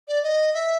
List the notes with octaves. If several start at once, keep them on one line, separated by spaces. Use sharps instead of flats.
D5
D#5
E5